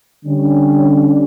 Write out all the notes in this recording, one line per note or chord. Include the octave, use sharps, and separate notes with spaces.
D3 G3 C#4 G4